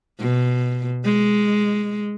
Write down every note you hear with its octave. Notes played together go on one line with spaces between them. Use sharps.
B2
G#3